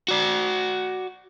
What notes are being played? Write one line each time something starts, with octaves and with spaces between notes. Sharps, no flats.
F#4 D5